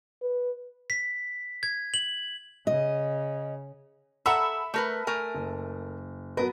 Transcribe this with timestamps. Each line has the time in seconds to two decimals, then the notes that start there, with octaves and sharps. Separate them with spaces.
0.22 B4
0.90 B6
1.63 G#6
1.94 F#7
2.67 C#3 D#5
4.26 A4 E5 F#5 A#5 B5 E6
4.74 A3 A#4 B4
5.07 A3 A#4 G#5
5.35 F#1
6.37 F#3 B3 A#4 B4